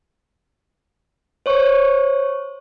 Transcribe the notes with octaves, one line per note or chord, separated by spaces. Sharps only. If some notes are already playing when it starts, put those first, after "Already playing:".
C5 C#5 C#6